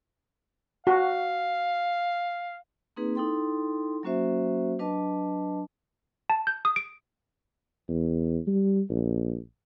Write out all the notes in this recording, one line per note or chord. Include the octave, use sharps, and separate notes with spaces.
F#4 F5
A#3 C4 D#4 G#4 B4
D#4 E4 A4 G5 C6
F#3 A#3 C#4 F#4 C5 E5
F#3 D4 B4 D#5 A5
A5
G6
D#6
D7
E2
G3
A#1